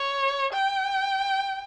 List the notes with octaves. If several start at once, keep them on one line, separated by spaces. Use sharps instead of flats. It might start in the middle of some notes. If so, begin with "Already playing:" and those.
Already playing: C#5
G5